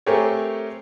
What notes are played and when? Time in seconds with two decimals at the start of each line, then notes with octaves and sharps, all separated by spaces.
0.06 A3 C4 G4 G#4 A#4 C#5